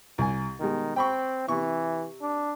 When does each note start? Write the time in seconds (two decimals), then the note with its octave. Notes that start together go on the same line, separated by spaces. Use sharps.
0.18 C2 G#5
0.61 B2 D#3 G3 G#3
0.96 C4 G5 B5 C#6
1.48 C3 E3 C#6
2.22 D4